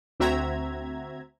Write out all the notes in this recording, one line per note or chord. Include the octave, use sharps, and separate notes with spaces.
D2 C4 F#4 E5 A#5 G#6